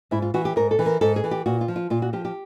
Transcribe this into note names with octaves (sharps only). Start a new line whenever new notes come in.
G#2 E4
F4
E3 F#4
G4
G#2 A#4
A4
E3
A#4
G#2 A4
G#4
E3
G4
A#2 F#4
F4
F3
F4
A#2 F4
F#4
F3 G4
G4